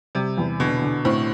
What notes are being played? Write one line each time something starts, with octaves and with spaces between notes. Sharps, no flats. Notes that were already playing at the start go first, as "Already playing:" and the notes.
C3 G3
E2
B2 D3
D3
A2 C4